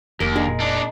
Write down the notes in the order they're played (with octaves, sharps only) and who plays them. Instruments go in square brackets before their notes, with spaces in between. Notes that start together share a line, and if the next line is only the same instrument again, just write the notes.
[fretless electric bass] F1 [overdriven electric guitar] D#2 [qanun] A#4
[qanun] G#3 [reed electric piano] D4
[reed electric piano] A#2
[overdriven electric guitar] D4 D#4